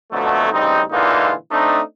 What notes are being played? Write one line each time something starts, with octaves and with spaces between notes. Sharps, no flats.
F2 B2 D3 F#3 A3
A1 C#3 G3 C4 D#4
A#2 D3 E3 G#3 D#4 F4
A3 C4 D4 D#4